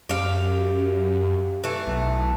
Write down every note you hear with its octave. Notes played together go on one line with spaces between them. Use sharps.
F#2 G4 F5
E3 A3
B1